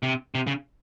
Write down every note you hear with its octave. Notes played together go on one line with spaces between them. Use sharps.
C3
C3
C#3